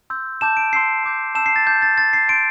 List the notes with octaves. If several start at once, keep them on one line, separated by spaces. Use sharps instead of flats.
C6 E6 G6
A5 D6 G6 E7
D7
C6 E6 G6 C7
A5 D6 G6
A5 E6 G6 E7
C7
A6
A5 D6 G6
A6
C6 G6 A6
C7
C6 G6 D7